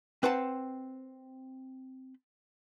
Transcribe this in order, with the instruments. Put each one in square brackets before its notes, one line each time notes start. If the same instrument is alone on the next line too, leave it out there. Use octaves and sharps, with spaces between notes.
[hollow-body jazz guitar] C4 B4 C5 F#5 A5